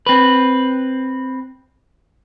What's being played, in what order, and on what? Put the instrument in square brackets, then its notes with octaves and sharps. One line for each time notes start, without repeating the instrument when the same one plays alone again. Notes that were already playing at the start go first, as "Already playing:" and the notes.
[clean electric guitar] C4 B4